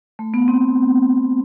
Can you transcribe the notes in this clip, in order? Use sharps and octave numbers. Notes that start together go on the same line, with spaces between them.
A3
B3
C4